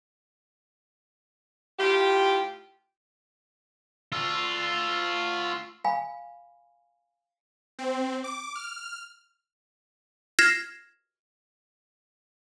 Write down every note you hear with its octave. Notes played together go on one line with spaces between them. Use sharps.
A2 F4 G4
A3 D4 F4
F5 G#5 B5
C4
D6
F6
F6 G#6 A#6 C7 E7